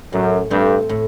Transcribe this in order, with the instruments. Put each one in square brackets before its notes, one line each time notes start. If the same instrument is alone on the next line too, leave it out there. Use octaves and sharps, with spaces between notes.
[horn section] F#2 [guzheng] A2
[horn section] G2 [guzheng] A3 C4
[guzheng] A2